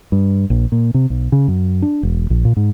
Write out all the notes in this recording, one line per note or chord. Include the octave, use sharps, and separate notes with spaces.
G2
A#1
A#2
C3
B1
C#3
F#2
D4
E1
A#1
A#2
G#2